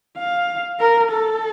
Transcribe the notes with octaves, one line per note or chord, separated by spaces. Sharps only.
F5
A#4
A4